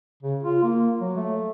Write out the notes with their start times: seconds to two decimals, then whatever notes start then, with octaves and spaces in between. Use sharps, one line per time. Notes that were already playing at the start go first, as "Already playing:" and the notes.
0.23 C#3
0.43 F4
0.63 A#3
1.01 F#3
1.17 A3